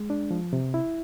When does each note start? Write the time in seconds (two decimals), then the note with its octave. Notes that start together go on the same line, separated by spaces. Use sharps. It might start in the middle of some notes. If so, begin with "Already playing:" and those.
Already playing: G#3
0.10 D4
0.31 F3
0.53 C3
0.74 E4